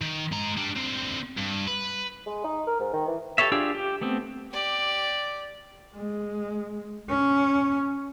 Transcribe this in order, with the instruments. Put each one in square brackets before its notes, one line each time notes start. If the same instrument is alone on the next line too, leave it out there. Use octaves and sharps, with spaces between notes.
[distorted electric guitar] D#3
G#3 A#5
G3 D4
D3 C4
G2
B4
[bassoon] G#3
D#4
A#4
G#2
D#3
E3
[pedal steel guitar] G4 A4 B4 C#5 E5
D4 F4 G4 G#4 E6
G4
A3 B3 C4
[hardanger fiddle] G4 D5
[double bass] G#3
C#4